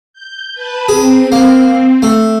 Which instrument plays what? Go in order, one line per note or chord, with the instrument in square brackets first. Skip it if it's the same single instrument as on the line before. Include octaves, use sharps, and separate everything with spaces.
[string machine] G6
B4 A5 B5
[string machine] C4 [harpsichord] G#4
[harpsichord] A#3
A3